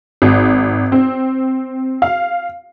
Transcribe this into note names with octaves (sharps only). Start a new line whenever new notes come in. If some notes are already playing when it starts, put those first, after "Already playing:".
G#1
C4
F5